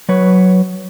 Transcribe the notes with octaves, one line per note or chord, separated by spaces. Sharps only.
F#3 B4 C#5